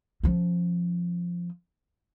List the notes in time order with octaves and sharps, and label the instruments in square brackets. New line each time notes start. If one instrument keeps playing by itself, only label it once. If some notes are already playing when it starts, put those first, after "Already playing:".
[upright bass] F3 C#4